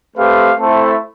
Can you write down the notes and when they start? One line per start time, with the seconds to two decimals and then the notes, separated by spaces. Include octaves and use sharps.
0.16 A3 C4 G4 B4 F5
0.59 A3 C4 E4 A4